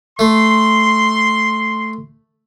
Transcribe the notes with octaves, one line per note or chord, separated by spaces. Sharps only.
A3 C6